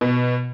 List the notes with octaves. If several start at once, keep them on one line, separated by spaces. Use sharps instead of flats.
B2